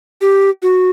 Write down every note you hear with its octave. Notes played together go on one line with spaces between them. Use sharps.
G4
F#4